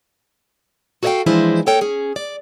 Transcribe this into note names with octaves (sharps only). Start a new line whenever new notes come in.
F#4 A4 C#5 D#5 F5 G5
E3 F3 G#3 D4 E4 C5
A#3 A4 C#5 G5
C#4 G#4
D5